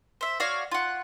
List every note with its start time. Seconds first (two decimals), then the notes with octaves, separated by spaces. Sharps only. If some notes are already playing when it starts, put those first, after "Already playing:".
0.21 C5 E5
0.40 F#4 C#5 D5 F5
0.71 F4 F#5